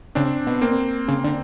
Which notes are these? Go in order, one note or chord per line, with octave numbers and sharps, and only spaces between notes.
C#3 C4 D4
B2
A#3 C4
C#3
D3